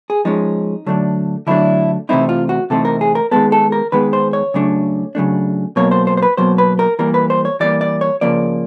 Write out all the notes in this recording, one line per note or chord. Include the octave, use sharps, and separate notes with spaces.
G#4
F3 G#3 C#4 D#4
D3 F#3 A3 D4
D3 F#3 A3 D4 E4
C3 E3 A3 C4 D#4 E4
F4
F#4
C3 E3 A3 C4 D#4 A4
A#4
G#4
A#4
D#3 G#3 B3 A4
A4
A#4
D#3 G#3 B3 B4
C5
C#5
C#3 F#3 A3 D4
C#3 F#3 A3 D4
B2 F#3 A#3 C#5
C5
C5
C5
B4
B2 F#3 A#3 C5
B4
A#4
E3 G3 A#3 A#4
B4
C5
C#5
E3 G3 A#3 D5
D5
C#5
C#3 F3 A#3 D5